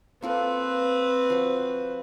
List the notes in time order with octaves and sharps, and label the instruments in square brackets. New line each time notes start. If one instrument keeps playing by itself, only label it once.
[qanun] A#3 F4 A4 [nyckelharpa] C4 B4
[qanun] F3 F#4